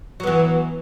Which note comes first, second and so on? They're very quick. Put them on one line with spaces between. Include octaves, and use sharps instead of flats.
F#3 B3 E3